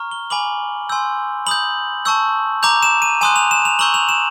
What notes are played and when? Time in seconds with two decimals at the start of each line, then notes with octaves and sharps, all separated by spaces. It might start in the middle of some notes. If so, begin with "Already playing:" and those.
Already playing: A#5 C#6 F6
0.11 G7
0.30 G#5 B5 D6 F#7
0.89 G#5 C6 E6 G6
1.46 B5 D#6 G6 F#7
2.05 A5 C#6 E6 G6
2.63 A#5 D6 G6 F7
2.83 E7
3.02 D#7
3.21 G#5 C6 D#6 F#6 D#7
3.36 F7
3.51 E7
3.65 F7
3.79 A#5 C#6 E6 G6 F#7
3.94 F7
4.09 E7